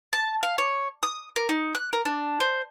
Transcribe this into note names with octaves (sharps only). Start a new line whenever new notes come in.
A5
F5
C#5
D#6
A#4
D#4
F#6
A#4
D4
C5